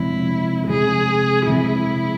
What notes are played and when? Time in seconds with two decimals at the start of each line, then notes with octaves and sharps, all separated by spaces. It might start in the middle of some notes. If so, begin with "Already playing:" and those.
Already playing: C3 F3 G#3 C4 E4
0.67 C3 F3 G#3 C4 G#4
1.47 C3 F3 G#3 C4 E4